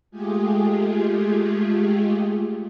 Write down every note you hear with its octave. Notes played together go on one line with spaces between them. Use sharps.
G#3 A3 F4 G4 G#4